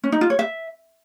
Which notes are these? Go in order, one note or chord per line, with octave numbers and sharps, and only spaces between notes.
C#4
D#4
F4
C#5
E5